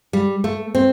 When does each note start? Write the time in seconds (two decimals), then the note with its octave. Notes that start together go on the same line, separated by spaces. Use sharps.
0.13 G3
0.44 A3
0.75 C4